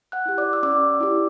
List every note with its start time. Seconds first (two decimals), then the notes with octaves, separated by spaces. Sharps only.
0.12 F#5 F#6
0.26 E4 G4
0.38 D5 D6
0.53 E6
0.63 C#4 D5 D6
1.00 E4 G4